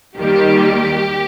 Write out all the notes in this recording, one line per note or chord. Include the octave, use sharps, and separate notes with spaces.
D#2 D#3 G3 A#3 G4